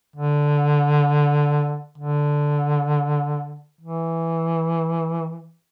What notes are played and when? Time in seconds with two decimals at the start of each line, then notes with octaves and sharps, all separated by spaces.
0.16 D3
1.98 D3
3.81 E3